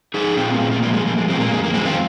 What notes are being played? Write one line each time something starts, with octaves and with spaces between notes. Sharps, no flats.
F3 D#4 G#4
A#2 C4 F4
A#3
A#2 G#3 C4
A#3
F3 A#3
G#3
F3 A#3
G#3
A#2 G#3 C4
A#3
F2 G#3
A#3
D#3 G#3 C4
C4 F4